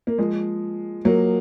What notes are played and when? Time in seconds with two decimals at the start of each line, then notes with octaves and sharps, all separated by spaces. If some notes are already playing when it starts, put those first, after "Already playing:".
0.07 A#3
0.18 F3 G#3
1.05 F#3 A#3